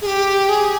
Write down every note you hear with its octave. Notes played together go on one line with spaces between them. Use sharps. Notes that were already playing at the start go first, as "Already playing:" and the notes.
G#4
G4
G#4